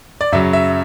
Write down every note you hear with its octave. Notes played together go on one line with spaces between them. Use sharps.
D5
F#2 C#3 F#3 E5
E5